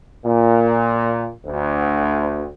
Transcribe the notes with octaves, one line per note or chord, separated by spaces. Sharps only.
A#2
D2